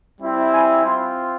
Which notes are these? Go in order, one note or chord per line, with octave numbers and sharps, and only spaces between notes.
G3 C4 E4
G#5
C4 F4 C6